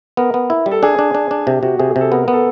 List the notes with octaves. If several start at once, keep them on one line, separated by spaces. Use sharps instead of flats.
B3 A#4
B3
E4
G3
A4
D4 G#4
D4
D4
D4
C3 G4
C3 F#4
C3 G#4
G#4
C3 A4
B3 A#4
A#4
B3
A4